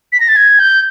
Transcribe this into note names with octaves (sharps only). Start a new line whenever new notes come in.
B6
A#6
A6
G#6
G6